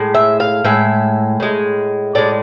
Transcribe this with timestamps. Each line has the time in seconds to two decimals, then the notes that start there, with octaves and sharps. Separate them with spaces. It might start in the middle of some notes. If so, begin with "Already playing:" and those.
Already playing: A2 G#3
0.15 E5
0.40 F5
0.65 A2 G#3 E5
1.40 A2 G#3
2.15 A2 G#3 D5